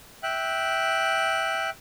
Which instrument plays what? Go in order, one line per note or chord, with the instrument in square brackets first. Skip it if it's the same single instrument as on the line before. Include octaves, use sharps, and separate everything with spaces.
[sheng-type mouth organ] E5 G5 F#6